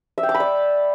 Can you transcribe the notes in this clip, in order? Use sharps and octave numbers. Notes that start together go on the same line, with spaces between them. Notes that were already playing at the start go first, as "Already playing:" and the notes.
E5
G5
D6
B5
D5